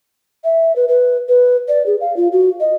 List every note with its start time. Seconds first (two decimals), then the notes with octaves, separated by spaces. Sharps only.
0.44 E5
0.76 B4
0.88 B4
1.29 B4
1.68 D5
1.86 G#4
2.01 F5
2.16 F4
2.32 F#4
2.60 D#5